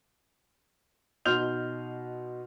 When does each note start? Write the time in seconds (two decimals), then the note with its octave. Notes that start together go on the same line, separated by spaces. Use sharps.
1.26 B2 D#4 C6 F6 G6 F7